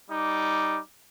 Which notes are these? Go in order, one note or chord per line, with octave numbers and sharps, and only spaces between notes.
G3 D#4 D6